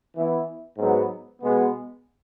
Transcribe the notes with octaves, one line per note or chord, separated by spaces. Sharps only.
E3 B3 E4
G#2 F#3 B3
B2 G#3 B3